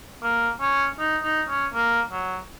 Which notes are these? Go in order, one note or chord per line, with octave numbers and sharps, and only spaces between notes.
A#3
C#4
D#4
D#4
C#4
A#3
F#3